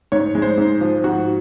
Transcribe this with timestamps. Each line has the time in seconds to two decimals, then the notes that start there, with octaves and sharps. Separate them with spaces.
0.12 G#2 C#5
0.35 G#3
0.42 C5
0.58 G#2
0.81 F3
1.04 G#2 F#4